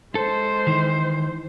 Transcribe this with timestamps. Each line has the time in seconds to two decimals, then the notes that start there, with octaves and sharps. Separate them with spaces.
0.15 G#3 A4 C5
0.67 D#3 E3